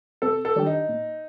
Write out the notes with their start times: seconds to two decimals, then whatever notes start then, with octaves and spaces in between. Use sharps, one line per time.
0.22 C3 A4
0.45 A4
0.56 D#3 G3 D4 G4
0.66 D#4
0.89 A#2